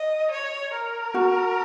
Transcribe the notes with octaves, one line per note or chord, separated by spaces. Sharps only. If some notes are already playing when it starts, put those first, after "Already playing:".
Already playing: D#5
C#5
A#4
F#4